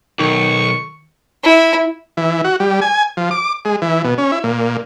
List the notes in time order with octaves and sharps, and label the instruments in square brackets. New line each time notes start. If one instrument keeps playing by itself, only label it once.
[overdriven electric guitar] B1 [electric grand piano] D#3 [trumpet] C#6
[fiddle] E4
[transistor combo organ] E3
F#4
G3
G#5
F3
D6
G#3
E3
B2
C#4
E4
A#2